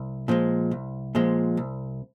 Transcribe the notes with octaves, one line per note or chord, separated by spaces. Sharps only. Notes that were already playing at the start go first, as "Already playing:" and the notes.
Already playing: C2
A#2 F3 G#3
C2
A#2 F3 G#3
C2